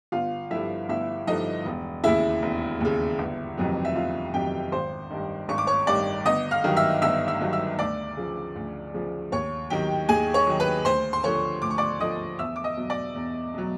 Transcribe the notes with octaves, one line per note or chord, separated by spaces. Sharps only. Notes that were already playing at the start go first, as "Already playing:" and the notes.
G1 F4 F5
G2 D3 F3 E4 E5
G1 E4 E5
G2 D3 F3 D#4 D#5
E1
D#2 C#3 E4 E5
E1
D#2 C#3
G1
F2 C3 D#3 F#3
E5
G1 F4 F5
F2 C3 D#3 F#3 G4 G5
G#1 C5 C6
G2 D#3
G#1 C#6
D6
C#5 C#6
G2 D#3 D5 D6
G1 D#5 D#6
F5 F6
G2 D#3 F#3
E5 E6
G1 E5 E6
E5 E6
G2 D#3 F#3
E5 E6
D2 D5 D6
C#3 F3
D2
C#3 F3
D#2 C#5 C#6
D#3 F#3 G4 G5
D#2 G#4 G#5
C#5 C#6
D#3 F#3
B4 B5
D2 C5 C6
C6
D3 F3 C#5 C#6
D2 D6
C#6
D5 D6
D3 F3 D#5 D#6
E2 E5 E6
D6
D#5 D#6
B2 F#3
D5 D6
E2
B2 F#3